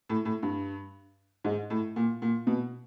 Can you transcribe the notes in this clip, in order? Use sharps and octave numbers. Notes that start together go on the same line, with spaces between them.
A2
A2
G2
G#2
A2
A#2
A#2
B2